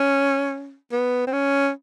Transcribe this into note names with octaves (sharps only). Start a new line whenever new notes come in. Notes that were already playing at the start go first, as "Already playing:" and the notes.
Already playing: C#4
B3
C4
C#4